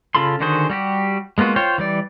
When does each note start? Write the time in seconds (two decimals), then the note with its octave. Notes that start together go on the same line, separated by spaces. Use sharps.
0.15 C#3 F4 A4 B5 C6
0.40 D3 D#3 F#4 G#4 C5
0.70 G3 F#4 G4
1.38 G#3 A#3 B3 F4 F#4
1.56 F4 C5 C#5 G5
1.78 E3 G3 D5